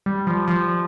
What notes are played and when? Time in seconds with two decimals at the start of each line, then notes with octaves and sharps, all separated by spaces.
0.06 G3
0.27 F3
0.48 F3